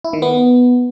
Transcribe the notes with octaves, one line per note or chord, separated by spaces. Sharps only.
E4
D#3
B3